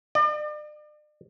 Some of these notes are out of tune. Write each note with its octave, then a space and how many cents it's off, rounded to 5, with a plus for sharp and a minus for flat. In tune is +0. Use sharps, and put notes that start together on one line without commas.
D5 +40